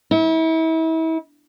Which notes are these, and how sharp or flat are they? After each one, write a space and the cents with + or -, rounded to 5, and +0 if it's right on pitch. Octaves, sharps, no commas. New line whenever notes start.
E4 -35